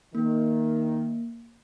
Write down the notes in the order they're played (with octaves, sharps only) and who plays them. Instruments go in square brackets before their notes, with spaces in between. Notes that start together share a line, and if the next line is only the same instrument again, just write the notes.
[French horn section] D#3 [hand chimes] A#3